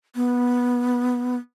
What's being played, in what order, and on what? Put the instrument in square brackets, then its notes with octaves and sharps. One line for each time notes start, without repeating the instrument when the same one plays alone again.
[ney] B3